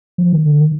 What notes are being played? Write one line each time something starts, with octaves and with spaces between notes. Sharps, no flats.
F3
D#3
D3
D#3